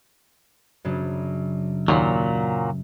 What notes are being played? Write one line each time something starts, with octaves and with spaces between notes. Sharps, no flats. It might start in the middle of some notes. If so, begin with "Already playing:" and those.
F#2 C#3 D4
D#2 A#2 F#3